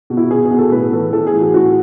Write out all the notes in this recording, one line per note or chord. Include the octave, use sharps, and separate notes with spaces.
B2
E4
B2 G#4
G#4
B2
A4
A2 B4
E3 A4
E3 A4
G#4
A2
F#4
A2 F#4